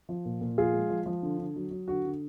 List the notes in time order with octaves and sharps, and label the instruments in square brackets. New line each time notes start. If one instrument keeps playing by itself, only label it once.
[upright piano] F3
A#2
A#2
F3 F4 G#4
G#3
F3
F3
D3
D3
F#3
F#3
D3 F#4
D3